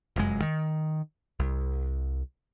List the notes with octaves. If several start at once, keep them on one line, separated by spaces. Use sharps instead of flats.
F1 F#2 G#3
D#3
C2